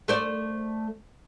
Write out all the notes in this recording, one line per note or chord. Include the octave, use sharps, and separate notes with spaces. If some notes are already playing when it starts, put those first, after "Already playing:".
A3 C5 D5